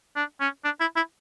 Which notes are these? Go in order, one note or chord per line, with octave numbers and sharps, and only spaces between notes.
D4
C#4
D4
E4
E4